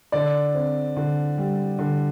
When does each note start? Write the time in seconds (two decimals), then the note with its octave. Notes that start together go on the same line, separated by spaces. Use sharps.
0.12 D3 D5
0.54 C4
0.97 D3
1.38 G3
1.79 D3